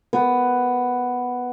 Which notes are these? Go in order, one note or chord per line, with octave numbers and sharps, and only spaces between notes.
B3